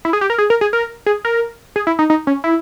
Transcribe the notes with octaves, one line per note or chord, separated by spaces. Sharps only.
E4
G#4
G4
A#4
G#4
A#4
G#4
A#4
G#4
A#4
G#4
E4
D#4
D#4
C#4
E4